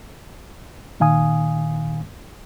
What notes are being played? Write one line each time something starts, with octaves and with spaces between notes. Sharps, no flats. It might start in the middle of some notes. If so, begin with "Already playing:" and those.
A#2 D#3 F5 G#5 D#6